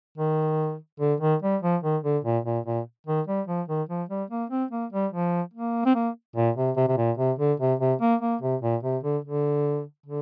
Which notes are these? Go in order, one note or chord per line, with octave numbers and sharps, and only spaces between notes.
D#3
D3
D#3
G3
F3
D#3
D3
A#2
A#2
A#2
D#3
G3
F3
D#3
F3
G3
A#3
C4
A#3
G3
F3
A#3
C4
A#3
A#2
C3
C3
C3
A#2
C3
D3
C3
C3
A#3
A#3
C3
A#2
C3
D3
D3
D3